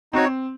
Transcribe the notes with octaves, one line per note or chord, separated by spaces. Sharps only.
C4 D#4 F#4 C#5